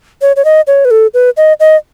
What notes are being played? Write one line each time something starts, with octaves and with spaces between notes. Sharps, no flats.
C#5
C#5
D#5
C#5
B4
A4
B4
D#5
D#5